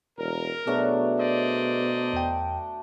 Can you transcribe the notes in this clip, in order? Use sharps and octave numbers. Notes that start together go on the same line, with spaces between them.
E1 A#4
B2 F#3 A3 D4 G#4 B4
C5 D5 D#5
E2 G5